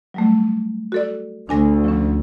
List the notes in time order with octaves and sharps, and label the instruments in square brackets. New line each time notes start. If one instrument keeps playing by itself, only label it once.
[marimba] F#3 G3 A3
F#4 A4 D5
[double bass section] D2 [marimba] D4 G#5 A#6
[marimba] F3 C#4